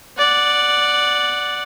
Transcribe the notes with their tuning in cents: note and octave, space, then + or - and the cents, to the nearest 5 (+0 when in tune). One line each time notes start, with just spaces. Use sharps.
D5 +0 F#5 +0